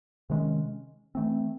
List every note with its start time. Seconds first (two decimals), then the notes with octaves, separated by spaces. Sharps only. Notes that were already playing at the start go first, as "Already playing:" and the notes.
0.30 C3 D#3 G#3 C#4
1.15 E3 A3 C4